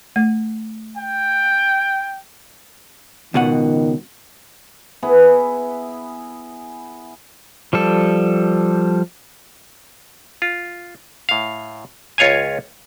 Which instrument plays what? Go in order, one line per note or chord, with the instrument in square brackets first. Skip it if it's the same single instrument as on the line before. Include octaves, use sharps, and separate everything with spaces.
[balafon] A3
[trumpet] G5
[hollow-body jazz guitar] C#2 B2 F#5 [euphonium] D#3
[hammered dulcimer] B3 E4 G#4 B4
[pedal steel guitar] F3 G3 A4
[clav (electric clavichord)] F4
A2 F5
C#2 F4 C#5 F5 G#5